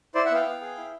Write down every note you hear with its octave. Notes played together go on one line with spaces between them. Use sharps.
E4 C5 D5
E5 F#5
B3 F5 G5
B3
G#4
E4